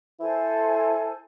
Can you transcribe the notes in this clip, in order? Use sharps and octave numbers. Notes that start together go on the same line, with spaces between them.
E4 A4 C5 G#5